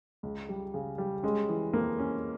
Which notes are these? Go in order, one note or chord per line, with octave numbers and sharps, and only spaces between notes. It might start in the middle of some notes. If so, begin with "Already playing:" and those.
C#2
G3
C#3
G3
G#3 C#4
E3
F2 A#3
C#4